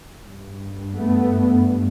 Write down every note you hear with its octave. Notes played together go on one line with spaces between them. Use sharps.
G2
A3 B3